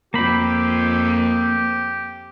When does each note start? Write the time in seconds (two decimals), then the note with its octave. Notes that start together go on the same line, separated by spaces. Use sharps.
0.14 F2 A#3 G4 B5